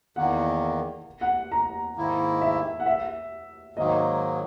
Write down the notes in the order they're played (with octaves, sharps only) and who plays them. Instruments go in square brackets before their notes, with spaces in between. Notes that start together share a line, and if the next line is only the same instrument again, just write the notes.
[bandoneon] E2 D#3 A#3 [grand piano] F#5
[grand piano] F#5
A#5
[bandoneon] G#2 D#3 A#3 E4
[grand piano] E5
F#5
E5
[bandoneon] G#2 D#3 F#3 A#3 [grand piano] D#5